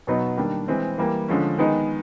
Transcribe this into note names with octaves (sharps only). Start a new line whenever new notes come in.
B2 F#3 B3 D#4
D#3 G3 A#3 D4
E3 G#3 C4
E3 G3 A#3
D3 F3 G#3 C#4
D#3 G#3 B3 D#4